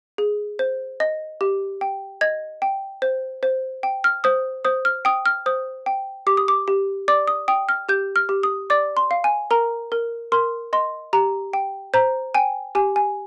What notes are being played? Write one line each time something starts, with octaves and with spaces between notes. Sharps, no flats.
G#4
C5
D#5
G4
G5
D#5 G#6
G5
C5
C5
G5
F6
C5 D#6
C5 D#6
F6
G5 D#6
F6
C5 D#6
G5
G4 D6
D#6
D6
G4
D5 D6
D#6
G5 D#6
F6
G4 G6
F6
G4
D#6
D5 D6
C6
F5
G#5
A#4 A#5
A#4
A#4 C6
D#5 C6
G4 A#5
G5
C5 A#5
G5 G#5
G4 G#5
G#5